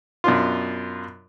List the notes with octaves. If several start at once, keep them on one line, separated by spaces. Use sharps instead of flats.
F#2 B2 D4 F4